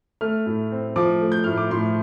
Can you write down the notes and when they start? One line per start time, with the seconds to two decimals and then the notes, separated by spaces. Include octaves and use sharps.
0.21 A3 F6
0.46 A2
0.72 C4
0.96 F3 D6
1.21 A3
1.32 G6
1.44 A2 F6
1.58 D6
1.71 A2 C6